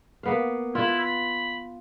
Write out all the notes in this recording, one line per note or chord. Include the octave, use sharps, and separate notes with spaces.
A#3 B3 F5
E4 F4 B4
B5